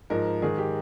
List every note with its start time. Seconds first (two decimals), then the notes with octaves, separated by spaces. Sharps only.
0.10 G#2 F3 A#4
0.42 G#2 D#3 G#4
0.58 G4